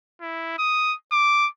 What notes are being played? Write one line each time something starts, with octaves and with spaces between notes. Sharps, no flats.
E4
D#6
D6